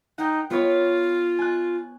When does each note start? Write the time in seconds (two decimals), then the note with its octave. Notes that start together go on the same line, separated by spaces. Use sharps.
0.18 D#4 F#5 G5 G6
0.50 B3 F4 B4 C#5
1.39 G#5 F#6